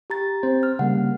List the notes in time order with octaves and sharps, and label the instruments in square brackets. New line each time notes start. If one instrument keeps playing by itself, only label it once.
[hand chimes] G4 A#5 A6
[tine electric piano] C4 C5
[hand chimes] F6
[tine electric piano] C#3 G3 A#3 [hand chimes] F#5